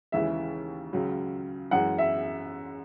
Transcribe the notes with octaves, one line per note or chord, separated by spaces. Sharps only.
D#2 C#3 E3 G#3 E5
C#2 C#3 F#3
F#2 E3 G#3 F#5
E5